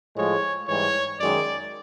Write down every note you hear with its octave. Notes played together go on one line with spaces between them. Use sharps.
A2 F3 G#3 C#5
G#2 E3 G3 C#5
F#2 D#3 G#3 D5